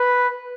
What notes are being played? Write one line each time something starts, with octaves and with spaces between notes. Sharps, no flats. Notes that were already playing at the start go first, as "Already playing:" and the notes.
Already playing: B4